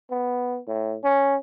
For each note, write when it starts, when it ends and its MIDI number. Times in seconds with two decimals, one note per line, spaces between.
0.11 0.58 59
0.67 0.96 45
1.04 1.36 61